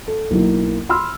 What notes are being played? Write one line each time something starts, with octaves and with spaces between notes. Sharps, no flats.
A4
B1 A#3 E4
B5 C6 E6 F6